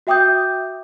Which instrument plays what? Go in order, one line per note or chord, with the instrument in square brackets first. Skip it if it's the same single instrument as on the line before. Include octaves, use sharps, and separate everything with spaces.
[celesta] F#4 E5 G5 D6 D#6 G6